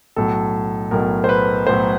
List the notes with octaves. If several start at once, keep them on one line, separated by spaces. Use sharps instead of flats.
B1 A2 F#3 A4
B1 A2 F#3 A#4
C5
B4
B1 A2 F#3 C5